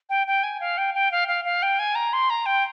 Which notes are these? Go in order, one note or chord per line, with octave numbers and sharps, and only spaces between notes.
G5
G5
G#5
F5
G5
G5
F5
F5
F5
G5
G#5
A#5
C6
A#5
G5